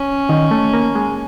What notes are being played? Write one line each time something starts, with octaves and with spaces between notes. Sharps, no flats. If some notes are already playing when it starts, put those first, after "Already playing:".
Already playing: C#4
D#3
A3
A#3
G#3